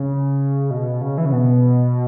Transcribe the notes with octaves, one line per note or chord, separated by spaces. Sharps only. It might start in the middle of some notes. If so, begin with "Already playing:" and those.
Already playing: C#3
B2
C#3
E3
C#3
B2